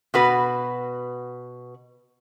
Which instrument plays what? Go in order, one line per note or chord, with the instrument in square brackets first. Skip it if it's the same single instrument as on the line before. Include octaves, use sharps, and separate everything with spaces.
[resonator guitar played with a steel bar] B2 F#4 B4